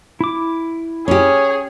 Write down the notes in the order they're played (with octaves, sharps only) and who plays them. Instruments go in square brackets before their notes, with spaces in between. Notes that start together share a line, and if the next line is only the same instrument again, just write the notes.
[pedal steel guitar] E4 D6
[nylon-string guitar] C#4 G4 [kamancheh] G#4 [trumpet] C#5